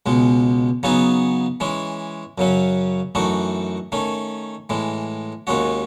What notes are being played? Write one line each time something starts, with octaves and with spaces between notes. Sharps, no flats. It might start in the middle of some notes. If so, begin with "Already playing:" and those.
C#2 B2 G#3
C#3 F#3 B3 D#4 G#4
E3 G#3 C#4
F#2 C#3 F#3 C#4
F#2 E3 A3 D#4 F#4
D#3 A3 C#4
A2 E3 G#3
D#2 D#3 G#3 C#4 F#4